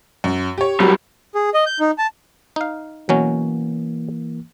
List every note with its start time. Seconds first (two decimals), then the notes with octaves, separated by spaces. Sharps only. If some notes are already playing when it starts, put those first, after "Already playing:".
0.24 F#2
0.58 G4 C#5
0.80 C#2 F#3 G3
1.35 G#4
1.54 D#5
1.66 G6
1.80 D#4
1.98 A5
2.56 D#4 F5
3.09 B2 E3 F#3 A#3 C#4